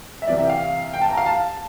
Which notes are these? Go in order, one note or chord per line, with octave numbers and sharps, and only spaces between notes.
E5
C2 C3 E3 D5
E5
G5
F5
G5
A5
A#5
F5
A5